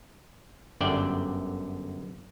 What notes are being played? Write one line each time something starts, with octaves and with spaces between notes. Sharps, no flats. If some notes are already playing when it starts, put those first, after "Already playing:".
G1 F#2 D3 D5 E5 G5